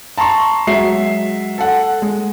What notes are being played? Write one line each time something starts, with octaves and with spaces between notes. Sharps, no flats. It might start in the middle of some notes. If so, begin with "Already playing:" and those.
A5 A#5 C6 C#6
F#3 G#3 E5 C7
A4 F#5
G#3